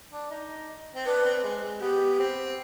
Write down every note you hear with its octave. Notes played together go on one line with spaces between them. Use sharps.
D4
D#4
C4
D4 B4
C4
G#3
G#3
B3 G4
C4